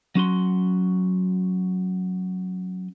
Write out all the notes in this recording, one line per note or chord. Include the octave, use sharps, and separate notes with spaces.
F#3 C#4 F#4 C6